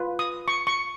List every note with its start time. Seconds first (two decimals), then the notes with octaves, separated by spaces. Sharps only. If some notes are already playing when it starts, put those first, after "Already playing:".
Already playing: F4 B4
0.19 D#6
0.48 C#6
0.67 C#6